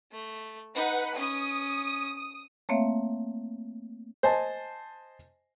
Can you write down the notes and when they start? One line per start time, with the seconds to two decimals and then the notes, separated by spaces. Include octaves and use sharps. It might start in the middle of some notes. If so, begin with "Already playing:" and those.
0.12 A3
0.75 D#4 B4 F#5
1.17 C#4 D#6
2.69 A3 A#3 C4 C#5 E5 F5
4.23 C5 D#5 G#5 A5